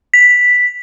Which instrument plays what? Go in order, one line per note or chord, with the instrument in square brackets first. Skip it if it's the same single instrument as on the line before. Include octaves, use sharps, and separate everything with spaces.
[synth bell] B6